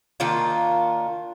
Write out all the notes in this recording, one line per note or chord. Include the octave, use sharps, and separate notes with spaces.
D#3 A#3 D4 F4